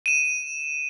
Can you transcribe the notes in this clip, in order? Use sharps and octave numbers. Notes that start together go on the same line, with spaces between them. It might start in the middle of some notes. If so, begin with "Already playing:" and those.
D#7 E7